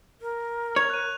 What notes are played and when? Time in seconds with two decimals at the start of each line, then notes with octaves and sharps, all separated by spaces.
0.21 A#4
0.76 C#5 G#6 F7
0.90 F#6 D#7